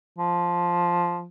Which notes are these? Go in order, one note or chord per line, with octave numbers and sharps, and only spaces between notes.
F3